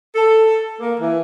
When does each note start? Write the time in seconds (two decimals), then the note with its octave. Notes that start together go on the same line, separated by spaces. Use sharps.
0.15 A4
0.80 A#3
1.01 E3